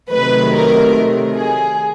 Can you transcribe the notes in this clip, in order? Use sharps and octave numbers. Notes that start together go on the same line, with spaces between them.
C3 D#3 F#3 A3 B4
A#4
G#4